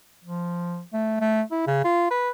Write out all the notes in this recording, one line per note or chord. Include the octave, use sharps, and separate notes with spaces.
F3
A3
A3
E4
C#3
F4
B4